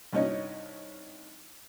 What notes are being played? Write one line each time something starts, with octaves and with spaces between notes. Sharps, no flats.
C2 G2 C#4 D#4 C#5 D#5